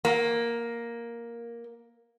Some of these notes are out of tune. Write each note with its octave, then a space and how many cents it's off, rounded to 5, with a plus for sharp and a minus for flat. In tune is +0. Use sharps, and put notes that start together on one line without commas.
A#3 +5